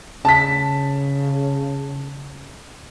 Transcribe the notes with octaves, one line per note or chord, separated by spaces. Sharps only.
C#3 A5 B6